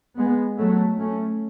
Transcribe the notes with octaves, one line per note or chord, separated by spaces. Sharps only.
G#3 B3
F#3 A3
A3 C#4